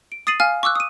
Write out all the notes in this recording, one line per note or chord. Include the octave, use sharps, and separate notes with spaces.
D7
D#6 A6 C7 D#7 F#7
F5 G#5 F6
C#6 D6 E6 F#6
D#6 D#7